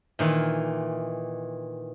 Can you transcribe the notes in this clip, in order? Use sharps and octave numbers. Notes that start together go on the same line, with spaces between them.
A#2 D#3 E3